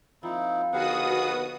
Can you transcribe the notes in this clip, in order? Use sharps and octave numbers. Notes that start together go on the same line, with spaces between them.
F3 A#3 C4 D#4 E4
D#2 D3 B3 F#4 G#4 F5 F#5 D#6